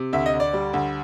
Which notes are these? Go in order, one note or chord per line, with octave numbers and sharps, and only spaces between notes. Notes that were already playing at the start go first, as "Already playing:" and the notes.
Already playing: C3
D2 E5
D#5
D2
D5
G3
D2